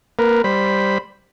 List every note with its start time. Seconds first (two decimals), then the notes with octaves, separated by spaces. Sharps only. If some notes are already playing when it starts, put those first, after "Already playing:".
0.19 A#3 A#4 B4
0.44 G3 C5 B5